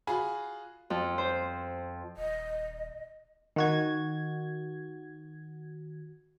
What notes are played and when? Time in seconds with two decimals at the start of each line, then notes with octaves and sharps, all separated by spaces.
0.07 F4 F#4 G#4 G#5 B5
0.90 F2
1.18 C5
2.17 D#1 D#5
3.56 D#3 F#4 G#6